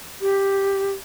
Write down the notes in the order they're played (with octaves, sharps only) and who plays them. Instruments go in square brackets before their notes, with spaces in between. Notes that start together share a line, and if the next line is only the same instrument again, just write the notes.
[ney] G4